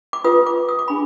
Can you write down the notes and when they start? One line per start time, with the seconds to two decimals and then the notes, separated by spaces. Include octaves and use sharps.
0.13 D6
0.24 F4 B4 D#6
0.46 D6
0.69 D#6
0.79 D6
0.88 D4 G#4 B5